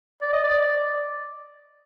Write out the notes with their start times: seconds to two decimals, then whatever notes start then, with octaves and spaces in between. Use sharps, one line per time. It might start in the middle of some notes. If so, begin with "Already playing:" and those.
0.22 D5
0.33 D#5
0.44 D5